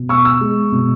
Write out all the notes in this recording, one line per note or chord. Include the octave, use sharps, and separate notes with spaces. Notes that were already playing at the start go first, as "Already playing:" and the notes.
Already playing: B2
B3 C#6 E6
C#6 E6
G#3
B2